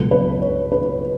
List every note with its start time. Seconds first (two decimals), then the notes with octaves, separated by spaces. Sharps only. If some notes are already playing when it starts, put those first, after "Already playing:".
Already playing: C#2 B2 F#3 A4
0.11 B4
0.42 C#5
0.72 B4